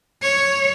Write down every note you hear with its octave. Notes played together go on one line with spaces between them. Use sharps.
C#5